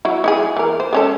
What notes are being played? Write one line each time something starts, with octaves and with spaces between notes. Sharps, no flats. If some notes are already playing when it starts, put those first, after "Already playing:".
F#3 E4 F#4
D#4 E4 G#4
E3 A#4
C5
G#3 C#4 A4